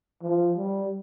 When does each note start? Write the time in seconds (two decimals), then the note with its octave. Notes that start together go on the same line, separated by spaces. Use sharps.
0.22 F3
0.57 G3